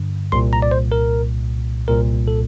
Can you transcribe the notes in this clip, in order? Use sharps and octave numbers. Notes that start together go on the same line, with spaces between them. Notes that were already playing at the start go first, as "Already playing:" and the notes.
Already playing: G2 D3
C2 A#2 C6
A#5
D5
C5
A#4
C2 A#2 A#4
A4